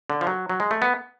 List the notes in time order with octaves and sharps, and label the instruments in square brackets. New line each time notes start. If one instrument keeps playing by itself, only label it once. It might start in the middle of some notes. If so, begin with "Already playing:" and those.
[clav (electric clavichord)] D3
F3
F#3
F#3
G#3
A3
B3